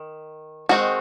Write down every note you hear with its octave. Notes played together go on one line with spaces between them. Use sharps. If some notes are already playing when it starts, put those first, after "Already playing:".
Already playing: D#3
D#3 G#3 C4 D#4 F#4